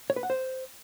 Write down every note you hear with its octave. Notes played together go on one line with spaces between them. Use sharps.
C#5
B4
F#5
C5